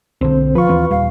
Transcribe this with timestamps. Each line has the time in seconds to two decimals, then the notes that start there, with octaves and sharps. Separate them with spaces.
0.21 B1 D3 C4 C5
0.55 F3 F4 B4 C#6
0.69 D#2 E3 C4
0.91 D#1 G3 F5